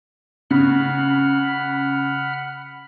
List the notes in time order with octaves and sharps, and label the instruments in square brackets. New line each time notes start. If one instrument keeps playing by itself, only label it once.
[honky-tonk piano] C#3 [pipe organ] F#5 B5 F6